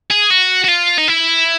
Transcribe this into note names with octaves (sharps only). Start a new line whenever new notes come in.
G#4
F#4
F#4
F4
D#4
E4